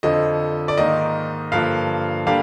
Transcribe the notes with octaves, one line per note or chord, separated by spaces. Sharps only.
F2 D3 F3 D#5
D5
G#2 D#3 A#3 D#5
G2 D3 F3 A#3 F5
D3 G3 A#3 D4 F5